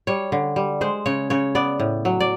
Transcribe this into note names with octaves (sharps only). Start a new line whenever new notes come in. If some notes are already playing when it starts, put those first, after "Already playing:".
G3 C#5
D3
G3
G#3 C5
C#3 C#5
C#3 C#5
B3 D5
A2
F#3
D5